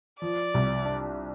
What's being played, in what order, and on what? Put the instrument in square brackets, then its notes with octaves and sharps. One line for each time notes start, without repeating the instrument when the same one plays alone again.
[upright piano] F3 [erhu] D5
[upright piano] C2
D4